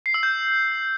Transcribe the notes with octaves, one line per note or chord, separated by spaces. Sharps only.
C7
E6
G6